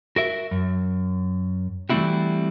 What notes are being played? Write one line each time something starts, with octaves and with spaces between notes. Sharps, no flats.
F#4 A#4 E5
F#2
E3 G3 A3 C4 E4 F#4